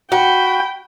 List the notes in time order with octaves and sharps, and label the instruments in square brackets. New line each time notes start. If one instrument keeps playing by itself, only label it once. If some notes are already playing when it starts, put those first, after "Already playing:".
[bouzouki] F#4 [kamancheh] G5 [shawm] B5